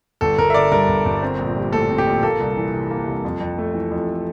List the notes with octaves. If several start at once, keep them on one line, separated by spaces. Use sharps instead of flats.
G1 A4
G1 A#4
E5
D3 D5
G2 A#4
G1
G1
C4
A#1
G3
A2 A4
C4
G4
A#1
A#3 A4
C2
E3
C3
A#3
C2
F2
F2
A3
E3
F2